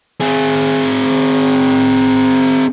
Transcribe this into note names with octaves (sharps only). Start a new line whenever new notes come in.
C4 G#4